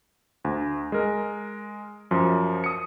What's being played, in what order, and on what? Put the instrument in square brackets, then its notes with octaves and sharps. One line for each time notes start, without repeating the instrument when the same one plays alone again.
[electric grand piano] D2
G#3 A#4
F#2 F3
D#6 C#7